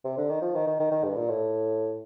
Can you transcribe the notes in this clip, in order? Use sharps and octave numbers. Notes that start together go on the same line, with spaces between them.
C3
D3
D#3
F3
D#3
D#3
D#3
D#3
G2
A#2
A2